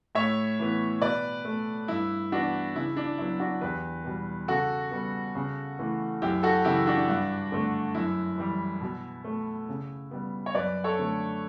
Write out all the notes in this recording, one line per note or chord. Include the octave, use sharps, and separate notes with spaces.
A2 C#5 E5
E3 B3
B2 B4 D5
A3
G2 E4
E3 B3 D4 F#4
C#3 E4
D4
F#3 B3 E4
D4 F#4
E2 G4 B4
B2 G3 B3
C#3 F#4 A4
G3 B3
C#3
E3 A3
F#2 E4 G4
F#4 A4
C#3 E3 E4 G4
D4 F#4
G2
D3 A3
F#2 E4
E3 G3
B2
A3
C#3
G3 B3
C#5
F#2 B4 D5
A4 C#5
D3 A3